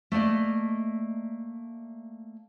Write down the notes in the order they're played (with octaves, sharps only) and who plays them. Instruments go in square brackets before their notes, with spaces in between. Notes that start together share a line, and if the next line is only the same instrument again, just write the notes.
[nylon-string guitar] A3 A#3 D5 D#5